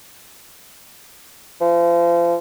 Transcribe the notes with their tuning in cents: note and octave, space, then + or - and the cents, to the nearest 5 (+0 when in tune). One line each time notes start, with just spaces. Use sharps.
F3 -35